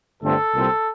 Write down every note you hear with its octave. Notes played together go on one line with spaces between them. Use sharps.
G1 G2 D3 A3 C4 A4
C2 A#2 G3 C4